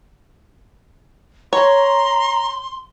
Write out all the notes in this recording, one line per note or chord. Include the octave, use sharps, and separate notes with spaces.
C#5 A#5 C6